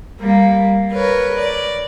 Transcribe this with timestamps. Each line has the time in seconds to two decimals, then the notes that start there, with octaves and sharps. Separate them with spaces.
0.20 G3 A#3
0.92 A#4 B4 C#5
1.37 D5